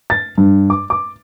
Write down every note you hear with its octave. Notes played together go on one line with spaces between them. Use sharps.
A6
G2
D6
D6